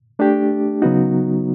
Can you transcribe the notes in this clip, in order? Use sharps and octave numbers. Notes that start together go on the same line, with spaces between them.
A3 D4 G4
C#3 F#3 B3 D#4 F#4